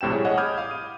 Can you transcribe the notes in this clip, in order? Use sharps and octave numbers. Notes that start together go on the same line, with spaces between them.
A#1 A2 C3 G5 E7
G3 E4 G#4 C#5
G#4 C#5 D#5 F#5
B5 D6 D#6 F6 G6 G#6
F5 D#6
D#7